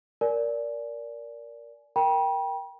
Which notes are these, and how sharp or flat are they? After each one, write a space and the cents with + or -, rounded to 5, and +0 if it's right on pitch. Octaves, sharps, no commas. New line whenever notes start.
A#4 +0 D5 -15 G#5 +20
A#4 +0 G5 +5 B5 -45